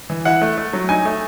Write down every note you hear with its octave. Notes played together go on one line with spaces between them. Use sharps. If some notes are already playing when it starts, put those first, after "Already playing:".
E3
E4 F#5
A3
A3
F#3
D#4 G#5
A3